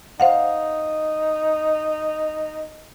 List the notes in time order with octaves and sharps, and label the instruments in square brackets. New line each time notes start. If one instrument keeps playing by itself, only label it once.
[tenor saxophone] D#4 [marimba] C5 F5 F#5